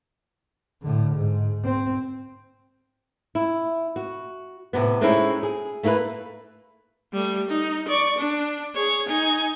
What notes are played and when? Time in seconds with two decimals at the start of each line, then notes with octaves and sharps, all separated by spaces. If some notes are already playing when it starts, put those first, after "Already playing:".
0.82 A2 D3
1.16 G#2
1.65 C4
3.35 E4
3.96 F#4
4.73 A2 C3 B3
5.01 G#3 A3 C4 C#4 D#4 E4
5.43 G#4
5.83 A3 A#3 E4 G#4 B4
7.13 G3 A3
7.49 D#4
7.88 D5 C#6
8.18 D4
8.75 G#4 C#5
9.08 D#4 G#5